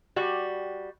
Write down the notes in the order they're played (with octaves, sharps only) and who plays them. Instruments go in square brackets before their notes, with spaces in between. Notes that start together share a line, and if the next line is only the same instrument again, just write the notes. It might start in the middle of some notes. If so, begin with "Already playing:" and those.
[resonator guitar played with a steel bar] G3 F#4